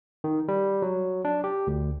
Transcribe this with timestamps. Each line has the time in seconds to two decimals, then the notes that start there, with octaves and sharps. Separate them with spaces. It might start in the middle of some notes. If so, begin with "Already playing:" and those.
0.24 D#3
0.48 G3
0.82 F#3
1.25 D4
1.44 G4
1.67 D2